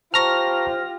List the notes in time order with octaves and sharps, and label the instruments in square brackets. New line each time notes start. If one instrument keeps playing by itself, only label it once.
[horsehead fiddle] F4 G4 [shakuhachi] C5 [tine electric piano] A5 A#5 C#6 [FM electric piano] F6 A#6